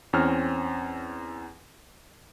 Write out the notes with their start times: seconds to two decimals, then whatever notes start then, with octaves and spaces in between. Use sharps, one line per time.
0.13 E2 C4 C#4 F6